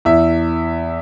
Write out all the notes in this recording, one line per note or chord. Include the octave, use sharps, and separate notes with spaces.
E2 E5